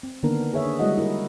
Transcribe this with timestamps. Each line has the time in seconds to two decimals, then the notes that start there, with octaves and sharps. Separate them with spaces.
0.03 C4
0.23 D3 D#3 A#3 B3 D4 A#4
0.54 G#4 B4 C#5 E5
0.65 D4
0.79 G3 G#3 E4 F#4 D#5 F#5
0.98 E4 A#4